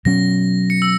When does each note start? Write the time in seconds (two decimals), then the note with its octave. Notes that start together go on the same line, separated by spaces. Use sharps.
0.05 B2 F#3 C#4 A#6
0.70 C#7
0.82 E6